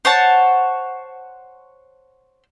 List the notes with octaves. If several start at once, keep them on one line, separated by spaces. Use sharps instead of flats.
C5 C#5 F#5 A5